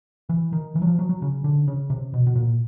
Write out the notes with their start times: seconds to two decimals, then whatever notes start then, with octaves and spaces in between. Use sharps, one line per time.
0.29 E3
0.53 D#3
0.75 E3
0.82 F#3
0.87 F3
0.99 F#3
1.09 F#3
1.22 C#3
1.44 D3
1.68 C#3
1.90 C3
2.14 B2
2.27 B2
2.36 A#2